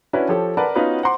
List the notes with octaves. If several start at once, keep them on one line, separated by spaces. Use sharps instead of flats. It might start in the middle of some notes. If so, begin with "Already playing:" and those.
C#4 D4 E4 F#4 B4
F3 G4 A4 C#5
A#4 B4 D5 F#5 A5 B5
B3 C#4 D#4 F4 F#4 B4
C5 F#5 A#5 C6 D6